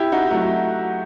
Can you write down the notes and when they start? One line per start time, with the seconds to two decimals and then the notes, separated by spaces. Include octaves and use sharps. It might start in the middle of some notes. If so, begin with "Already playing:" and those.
Already playing: E4 G4
0.12 D#4 F#4
0.30 F#3 A3